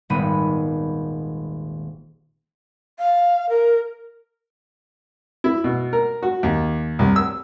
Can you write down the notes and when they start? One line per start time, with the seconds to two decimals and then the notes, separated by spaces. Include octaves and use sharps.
0.10 D#1 G#1 G3 B3 B5 D#7
2.99 F5
3.49 A#4
5.44 E4
5.64 B2
5.93 A#4
6.23 F#4
6.43 D#2
6.99 C2
7.16 E6